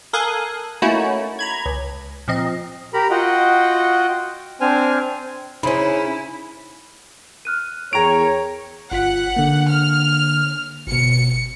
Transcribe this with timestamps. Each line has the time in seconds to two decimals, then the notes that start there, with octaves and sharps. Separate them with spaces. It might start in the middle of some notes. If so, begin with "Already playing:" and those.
0.13 A4 A#4 F5 G#5 D#6 F#6
0.82 A3 A#3 C#4 D#4 E4 F#4
1.39 A#5 B5 G#6
1.66 C#2
2.28 A#2 F3 C4 D#5
2.94 G4 A#4 A#5 B5
3.10 F4 F#4 D#5 F#5 G5
4.61 C4 D4 C5 G#5 F6
5.63 C#3 C#4 D#4 E4 C5 B5
7.45 F6 F#6 D#7
7.93 E2 G#4 A#4 C#5 G5 A#5 D7 F7
8.92 G1 F4 F#5 B6
9.36 D3 A#3
9.70 F6
10.88 G1 B2 C#7